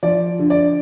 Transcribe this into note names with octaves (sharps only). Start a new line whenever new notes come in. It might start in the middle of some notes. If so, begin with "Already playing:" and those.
F3 D5
D3
D5